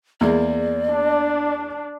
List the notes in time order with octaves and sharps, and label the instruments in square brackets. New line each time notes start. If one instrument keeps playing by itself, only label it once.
[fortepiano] E2 G#3 A#3 [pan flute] D5
[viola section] D4